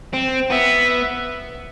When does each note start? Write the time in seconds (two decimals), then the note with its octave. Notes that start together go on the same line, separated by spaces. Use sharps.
0.13 C4
0.50 B3 E5